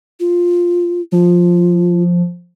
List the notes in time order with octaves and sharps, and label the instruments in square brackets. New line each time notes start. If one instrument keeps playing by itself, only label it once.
[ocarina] F4
[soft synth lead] F3 [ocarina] F4